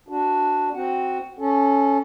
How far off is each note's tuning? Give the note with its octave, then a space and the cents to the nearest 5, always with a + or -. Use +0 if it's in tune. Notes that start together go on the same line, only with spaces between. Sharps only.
D4 +0 F#4 +0
C4 +0 F#4 +0 F#5 +0
C#4 +0 A4 -15